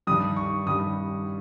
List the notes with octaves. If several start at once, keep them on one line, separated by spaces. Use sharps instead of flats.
G2 D#3 G3 D#6
C#6
G2 D#3 G3 D#6